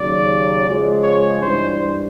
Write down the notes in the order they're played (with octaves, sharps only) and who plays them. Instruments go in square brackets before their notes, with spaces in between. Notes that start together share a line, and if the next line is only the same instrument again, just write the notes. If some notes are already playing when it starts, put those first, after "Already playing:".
Already playing: [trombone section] D#2 C#3 F#3 [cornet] D5
[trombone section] C#3 F3 G#3
[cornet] C#5
[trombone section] G2 E3 G3 [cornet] C5